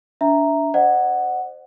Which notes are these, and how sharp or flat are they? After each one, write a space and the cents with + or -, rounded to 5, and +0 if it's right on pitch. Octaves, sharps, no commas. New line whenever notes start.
D4 -25 E5 +0 A#5 +0
C5 +0 D#5 -45 F#5 +0